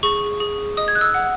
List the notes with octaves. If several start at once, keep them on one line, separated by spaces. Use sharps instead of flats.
G#4 C#6
G#4
D#5 D#6
G#6
F#6
E6
F#5